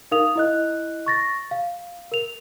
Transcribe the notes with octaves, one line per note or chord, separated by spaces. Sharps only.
D#4 A#4 F5 D#6 F7
E4 D#5 F#6
C#6 A6 A#6
F5
A#4 F7